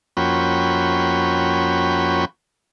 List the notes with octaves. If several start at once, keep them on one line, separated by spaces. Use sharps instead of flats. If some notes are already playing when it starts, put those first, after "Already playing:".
F2 A#3 C#4 F#4 G5 B5